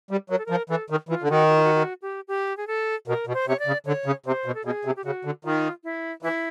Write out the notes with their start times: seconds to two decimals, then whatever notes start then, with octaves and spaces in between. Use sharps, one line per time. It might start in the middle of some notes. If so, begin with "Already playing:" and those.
0.11 G3
0.30 F#3 A#4
0.38 A4
0.46 F3 A#4
0.70 E3 A4
0.90 D#3
1.09 E3 F4
1.22 D3
1.29 D#3 F#4
1.49 F#4
1.56 F4
1.64 F#4
1.75 F#4
2.02 G4
2.28 G4
2.57 G#4
2.67 A4
3.07 B2 A#4
3.27 B2
3.33 C5
3.47 C3 C#5
3.59 D5
3.66 C#3
3.86 D3 C#5
4.06 C#3
4.26 C3 C5
4.46 B2
4.55 A4
4.65 B2 G#4
4.85 C3
4.96 G4
5.04 C#3 F#4
5.25 D3
5.44 D#3 F4
5.84 E4
6.23 E3 E4